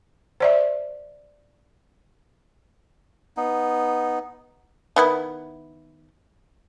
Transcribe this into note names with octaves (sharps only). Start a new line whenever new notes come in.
C5 D5 E5
B3 D#4
D#3 B3 E4